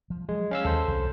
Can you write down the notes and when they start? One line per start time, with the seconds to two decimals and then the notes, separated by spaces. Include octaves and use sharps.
0.10 F3
0.29 F3 F#3 G#3
0.51 C#4 F5 E6
0.65 D#2 E3 A4 C5
0.88 C2 F2